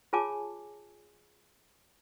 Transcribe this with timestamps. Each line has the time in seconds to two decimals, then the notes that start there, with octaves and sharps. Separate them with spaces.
0.13 F4 G#4 C#5 G#5 A5 D6